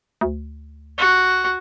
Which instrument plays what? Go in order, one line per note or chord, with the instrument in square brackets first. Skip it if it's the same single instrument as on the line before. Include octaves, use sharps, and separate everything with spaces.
[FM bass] D2
[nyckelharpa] F#4